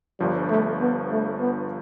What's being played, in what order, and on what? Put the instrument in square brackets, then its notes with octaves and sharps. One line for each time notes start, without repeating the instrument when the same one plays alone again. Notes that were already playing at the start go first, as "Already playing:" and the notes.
[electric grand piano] G1 G2 F3 [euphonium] G3
[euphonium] A3
B3
A3
B3